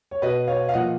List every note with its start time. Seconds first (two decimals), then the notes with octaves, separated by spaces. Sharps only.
0.11 C#5
0.22 B2 B4 D#5
0.47 C#5 F5
0.69 F5
0.74 A#2 F3 D#5 F#5